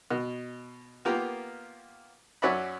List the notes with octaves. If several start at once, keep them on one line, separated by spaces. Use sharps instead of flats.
B2
A#3 B3 F4 G4 A#4
F#2 C#4 F#4 D5 E5 B5